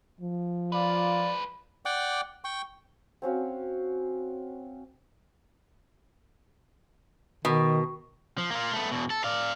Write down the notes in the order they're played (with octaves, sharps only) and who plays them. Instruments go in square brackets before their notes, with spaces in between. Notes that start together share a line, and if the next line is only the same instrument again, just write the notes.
[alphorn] F3
[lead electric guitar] G#3 B4 [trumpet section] F4 D5
[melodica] D5 F#5 G5 D6
G5 C#6
[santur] C4 C#4 F#4 F5
[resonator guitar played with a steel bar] B2 [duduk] D#3
[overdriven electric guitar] F3
A#3 F4
A3 B3
E2 B2
A4
D5 F5